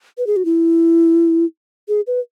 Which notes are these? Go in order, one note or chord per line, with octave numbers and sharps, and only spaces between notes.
B4
G#4
F#4
E4
G#4
B4